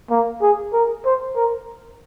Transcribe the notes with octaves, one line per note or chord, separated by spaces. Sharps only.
A#3
G#4
A#4
C5
A#4